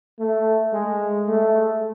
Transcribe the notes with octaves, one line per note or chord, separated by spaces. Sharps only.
A3
G#3
A3